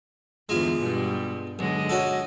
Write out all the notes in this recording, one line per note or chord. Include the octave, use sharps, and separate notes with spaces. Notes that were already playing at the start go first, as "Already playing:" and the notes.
E2 G2 D3 G#3 F4
G2 B2 G3
B1 D3 G#3 D#5
C#4 F#4 A4